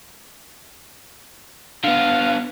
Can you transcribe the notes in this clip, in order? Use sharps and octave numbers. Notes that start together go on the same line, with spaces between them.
D3 B3 F5